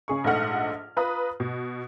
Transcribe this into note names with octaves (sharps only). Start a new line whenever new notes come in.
C#3 G#4 C#6
A#1 G#2 A3 D#5 F#5 F6
F4 B4 A#5 D#6
B2